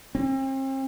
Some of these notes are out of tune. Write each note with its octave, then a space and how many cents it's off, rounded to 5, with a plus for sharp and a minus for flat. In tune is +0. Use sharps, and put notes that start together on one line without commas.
C4 +40